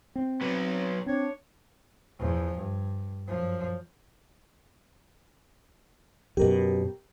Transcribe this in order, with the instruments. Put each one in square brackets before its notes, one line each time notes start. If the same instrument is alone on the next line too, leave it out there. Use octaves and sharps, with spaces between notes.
[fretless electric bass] C4
[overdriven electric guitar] F#3 B3
[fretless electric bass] C4 [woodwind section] D4 C#5
[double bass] E2 F3
G2
F#2 F3
[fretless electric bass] F#2 B2 [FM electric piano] G4 A#4